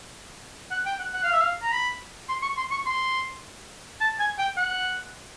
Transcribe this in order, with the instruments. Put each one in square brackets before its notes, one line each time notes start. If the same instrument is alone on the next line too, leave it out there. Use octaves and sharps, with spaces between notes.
[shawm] F#5
G5
F#5
F#5
F5
E5
F5
A#5
B5
C6
C#6
C6
C#6
C6
A5
G#5
G5
F#5